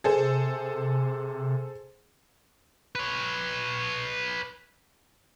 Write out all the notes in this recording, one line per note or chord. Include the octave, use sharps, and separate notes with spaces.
C3 G#4 A4 C5
B4 C#5